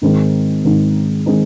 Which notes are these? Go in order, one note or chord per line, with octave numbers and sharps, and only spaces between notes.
G#2 D#3 G#3 C4 D#4
G#2 D#3 G#3 C4 D#4
D#3 G#3 C4 D#4